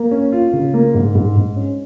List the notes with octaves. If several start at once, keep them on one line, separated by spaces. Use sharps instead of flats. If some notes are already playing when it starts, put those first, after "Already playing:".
Already playing: A#3
C#4
F4
C#3
A#3
G#2
G#2
G#2
C#4